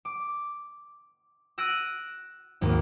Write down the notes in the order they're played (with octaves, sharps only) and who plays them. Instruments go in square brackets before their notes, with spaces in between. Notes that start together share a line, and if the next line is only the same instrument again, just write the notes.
[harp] D6
E6 F#6 A#6 D7 D#7
G#1 D#2 A#3